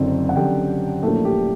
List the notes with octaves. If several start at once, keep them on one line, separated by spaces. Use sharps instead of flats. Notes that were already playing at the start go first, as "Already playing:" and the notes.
Already playing: F#1 F#2 D3 C4
F#5
F#1 F#2 D3 G4 G5
A#1 A2 F#3 A3 A#3 A4
G4